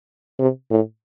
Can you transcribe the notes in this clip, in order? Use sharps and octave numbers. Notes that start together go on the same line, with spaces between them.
C3
A2